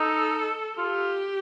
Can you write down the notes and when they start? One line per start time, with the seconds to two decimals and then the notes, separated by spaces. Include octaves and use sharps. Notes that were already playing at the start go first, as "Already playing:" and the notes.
Already playing: D#4 A4
0.78 F4 G4